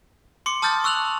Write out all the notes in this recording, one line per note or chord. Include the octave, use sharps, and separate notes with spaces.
C6 D6 C#7
A5 D#6 F6 G6 A6
C#6 E6 F#6 F7 F#7